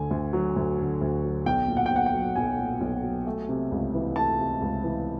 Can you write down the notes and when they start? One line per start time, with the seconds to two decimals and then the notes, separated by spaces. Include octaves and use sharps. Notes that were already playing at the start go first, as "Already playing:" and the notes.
Already playing: D2 D3 G#5
0.11 D2
0.33 F#3
0.56 D2
0.79 D3
1.01 D2
1.24 F#3
1.46 B1 G5
1.68 A#2
1.77 F#5
1.86 B1 G5
1.96 F#5
2.06 G5
2.13 F#3
2.35 B1 G#5
2.59 A#2
2.81 B1
3.03 F#3
3.27 A3
3.49 C3
3.72 C#2
3.94 E3
4.16 A3 A5
4.39 C3
4.62 C#2
4.84 E3